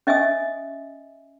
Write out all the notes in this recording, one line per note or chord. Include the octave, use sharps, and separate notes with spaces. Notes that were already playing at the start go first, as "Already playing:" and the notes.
C#4 D#5 E5 G#5 D#6